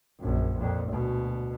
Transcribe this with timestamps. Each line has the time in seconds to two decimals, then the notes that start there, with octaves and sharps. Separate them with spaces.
0.20 A#1 F#2
0.58 F2 A#2
0.90 D2 B2